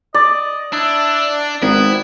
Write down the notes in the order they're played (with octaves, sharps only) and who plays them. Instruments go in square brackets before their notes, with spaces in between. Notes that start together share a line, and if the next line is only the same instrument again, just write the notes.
[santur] D5 [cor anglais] D#5
[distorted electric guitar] D4 [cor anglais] E4
[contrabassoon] G#1 [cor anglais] B3 [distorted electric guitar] E4